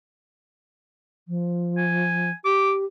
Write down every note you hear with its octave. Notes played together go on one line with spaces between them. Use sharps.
F3
G#5
G4 D6